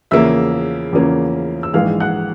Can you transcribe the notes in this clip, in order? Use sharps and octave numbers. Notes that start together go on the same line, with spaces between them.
E2 C#3 F3 A#3 C#4 E5 E6
E2 C#3 F3 A#3 C#4
E6
A#1 G#2 E3 G#3 F5 F6
F#5 F#6